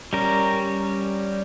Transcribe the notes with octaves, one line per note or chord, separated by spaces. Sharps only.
G3 C#4 A#4